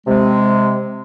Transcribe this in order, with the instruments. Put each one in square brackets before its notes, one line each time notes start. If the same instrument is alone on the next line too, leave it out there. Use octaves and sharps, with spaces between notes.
[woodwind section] C3 G#3